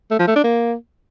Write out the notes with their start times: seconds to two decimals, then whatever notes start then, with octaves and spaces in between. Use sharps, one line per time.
0.11 A3
0.19 F3
0.27 A3
0.36 D4
0.44 A#3